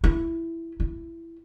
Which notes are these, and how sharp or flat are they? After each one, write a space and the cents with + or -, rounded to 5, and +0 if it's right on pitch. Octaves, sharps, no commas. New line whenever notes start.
E4 +10
E4 +15